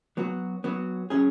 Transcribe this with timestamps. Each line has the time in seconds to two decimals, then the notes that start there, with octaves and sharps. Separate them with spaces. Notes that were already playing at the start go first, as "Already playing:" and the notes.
0.17 F#3 B3 F#4
0.64 F#3 B3 F#4
1.10 F#3 C#4 G#4